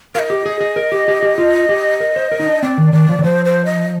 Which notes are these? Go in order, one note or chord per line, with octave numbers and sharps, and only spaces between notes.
A#4 D#5 F5
G4
G#4
G#4
A#4
G4
G4
G4
F4
G4
A#4
C5
A#4
D#4
D4
C4 D5
D#3
D#3 D5
F3
D#3
F3 C5
C5
D#5